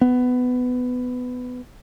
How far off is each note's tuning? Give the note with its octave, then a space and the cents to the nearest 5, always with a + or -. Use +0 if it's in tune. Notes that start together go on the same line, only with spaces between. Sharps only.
B3 +15